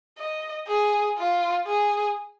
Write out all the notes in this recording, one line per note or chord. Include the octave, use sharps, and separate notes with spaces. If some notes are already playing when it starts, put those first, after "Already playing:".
D#5
G#4
F4
G#4